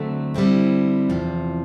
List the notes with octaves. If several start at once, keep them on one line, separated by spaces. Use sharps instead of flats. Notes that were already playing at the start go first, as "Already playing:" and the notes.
Already playing: D2 D3 F#3 A3 C4
D3 G3 C4 E4
E2 C3 F3